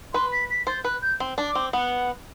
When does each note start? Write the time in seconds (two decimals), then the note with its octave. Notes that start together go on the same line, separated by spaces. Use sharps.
0.13 B4 C6
0.32 B6
0.50 B6
0.67 C5 A6
0.84 B4 F#6
1.02 G6
1.20 C4
1.38 D4
1.47 D6
1.55 C4
1.73 B3 F#5